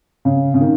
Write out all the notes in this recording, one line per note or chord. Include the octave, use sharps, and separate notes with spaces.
C#3
C#3
D#3